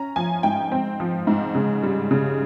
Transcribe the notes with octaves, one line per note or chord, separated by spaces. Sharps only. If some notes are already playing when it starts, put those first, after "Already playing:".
Already playing: C#4 A#5
F3 G#5
G#2 G5
C4
F3
G#2
C#3
G3
C#3